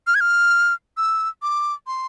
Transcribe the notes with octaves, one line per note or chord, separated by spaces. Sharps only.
F6
G#6
F6
E6
D6
C6